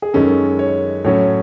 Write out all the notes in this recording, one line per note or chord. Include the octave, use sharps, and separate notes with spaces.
G#4
F#2 D#3 G#3 C#4 A4
C#5
A2 F#3 C#4 C#5